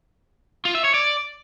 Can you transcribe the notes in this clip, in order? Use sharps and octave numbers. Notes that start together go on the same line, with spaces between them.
F4
E5
C#5
D5